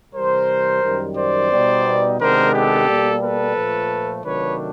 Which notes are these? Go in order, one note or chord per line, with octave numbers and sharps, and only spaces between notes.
C3 E3 G3 A#4 C5
F#2 D#3 G3
C5 D5
B2 G3 B3 D#4
C3 D#3 G#3 B3 D4 A#4 C5
G4 A4
B2 G3 A#3
A4 B4
A#2 F3 A3
C3 D#3 F#3 A3 D4 B4 C#5